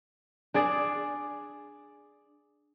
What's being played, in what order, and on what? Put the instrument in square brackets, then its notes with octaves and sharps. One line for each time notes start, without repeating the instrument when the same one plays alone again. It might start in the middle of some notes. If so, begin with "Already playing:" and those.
[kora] D4 G#4 D5